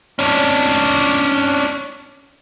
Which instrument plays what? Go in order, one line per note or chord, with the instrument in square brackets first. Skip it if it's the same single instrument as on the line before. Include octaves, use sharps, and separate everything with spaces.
[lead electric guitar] C#4 D4